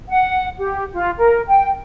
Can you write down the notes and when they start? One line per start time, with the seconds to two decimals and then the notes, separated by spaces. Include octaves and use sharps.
0.09 F#5
0.58 G4
0.93 F4
1.17 A#4
1.48 G5